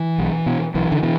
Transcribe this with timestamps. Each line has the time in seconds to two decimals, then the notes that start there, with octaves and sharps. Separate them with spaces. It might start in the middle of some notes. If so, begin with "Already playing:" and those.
Already playing: E3
0.18 B1
0.46 B2
0.75 B1 E3
0.92 D3
1.03 B2 E3